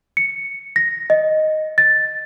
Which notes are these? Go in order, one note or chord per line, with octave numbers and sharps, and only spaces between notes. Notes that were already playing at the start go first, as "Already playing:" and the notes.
C#7
A#6
D#5
A6